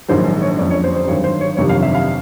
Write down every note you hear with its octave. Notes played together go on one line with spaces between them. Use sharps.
A#1 G#2 D#3 F#3 C5
C#5
F#1 F2 D3 D5
C#5
C5
C5
G#1 G2 D#3 F#3 C#5
C5
C#5
G1 F2 C3 D#3 F#3 C#5
F5
E5
F5